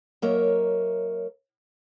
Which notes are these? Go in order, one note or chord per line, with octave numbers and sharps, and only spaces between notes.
F#3 A#3 A#4 C#5 D#5 E5